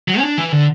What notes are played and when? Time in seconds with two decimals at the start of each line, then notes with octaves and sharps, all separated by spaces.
0.08 F#3
0.18 C#4
0.23 D4
0.38 E3
0.52 D3